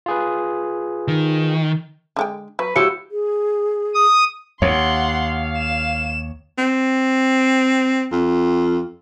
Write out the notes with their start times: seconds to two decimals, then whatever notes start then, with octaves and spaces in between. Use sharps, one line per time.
0.06 F4 G#4 B4
1.08 D#3
2.16 D3 G#3 G5
2.59 F#3 B4
2.76 F3 G#3 E4 F#4 G4 C#5 C#7
3.11 G#4
3.95 D#6
4.62 D#2 C#5 F5 F#5 C6
5.58 E7
6.58 C4
8.12 F2